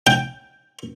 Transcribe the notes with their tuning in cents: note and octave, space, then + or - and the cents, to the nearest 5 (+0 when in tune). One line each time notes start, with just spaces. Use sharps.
G5 +5